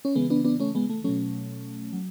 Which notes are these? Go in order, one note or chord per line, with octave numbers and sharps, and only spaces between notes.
C#4
C#3 E3 G#3 B3
B3 D4
B3 D4
A3 C#4
G#3 B3
A3
B2 F#3 A3 C#4
F#3